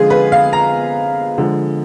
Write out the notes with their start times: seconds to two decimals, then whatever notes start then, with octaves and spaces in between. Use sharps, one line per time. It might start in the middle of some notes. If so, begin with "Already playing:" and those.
Already playing: D3 F3 G#3 F4 G#4
0.10 B4
0.32 F5
0.53 A#5
1.38 D3 F3 G#3